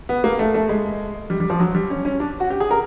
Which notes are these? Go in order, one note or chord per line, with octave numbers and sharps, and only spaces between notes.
B3
A#3
A3
A3
G#3
G3
G3
F3
F#3
G3
C#4
C#4
D4
F#4
G4
G#4
A#4